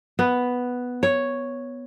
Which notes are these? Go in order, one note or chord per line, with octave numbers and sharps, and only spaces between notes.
B3
C#5